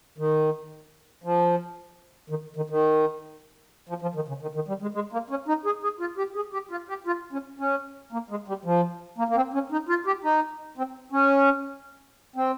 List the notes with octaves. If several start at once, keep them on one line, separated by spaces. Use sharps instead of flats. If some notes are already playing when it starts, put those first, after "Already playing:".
D#3
F3
D#3
D#3
D#3
F3
F3
D#3
C#3
D#3
D#3
G3
G#3
G#3
A#3
C#4
D#4
G#4
G#4
F4
G4
G#4
G4
F4
G4
F4
C#4
C#4
A#3
G#3
G3
F3
A#3
A#3
C4
C#4
D#4
F4
G4
D#4
C4
C#4
C4